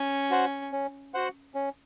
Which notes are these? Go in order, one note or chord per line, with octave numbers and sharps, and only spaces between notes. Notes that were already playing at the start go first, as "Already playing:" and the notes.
Already playing: C#4
F#4 C5 F#5
C#4
F#4 C5 F#5
C#4